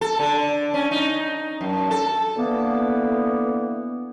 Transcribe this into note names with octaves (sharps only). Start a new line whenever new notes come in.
A4
D3
C#4
D#4
F#2
A4
D3 E3 A#3 B3